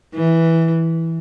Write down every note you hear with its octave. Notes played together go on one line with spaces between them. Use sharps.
E3